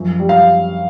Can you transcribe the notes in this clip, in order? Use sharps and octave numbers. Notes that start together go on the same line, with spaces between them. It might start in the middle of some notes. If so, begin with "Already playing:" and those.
Already playing: F#2 F3
G3
F5